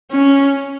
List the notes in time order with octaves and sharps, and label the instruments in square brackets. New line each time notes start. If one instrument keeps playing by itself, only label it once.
[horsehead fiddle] C#4